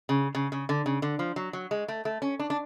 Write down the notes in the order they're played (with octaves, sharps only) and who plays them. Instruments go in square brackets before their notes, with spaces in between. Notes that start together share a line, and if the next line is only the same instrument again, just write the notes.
[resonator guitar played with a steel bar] C#3
C#3
C#3
D3
C#3
D3
F3
F#3
F#3
G#3
A3
A3
C#4
D4
D4